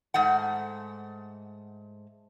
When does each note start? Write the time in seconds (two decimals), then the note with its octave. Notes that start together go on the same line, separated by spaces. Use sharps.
0.14 G#2 A3 F#5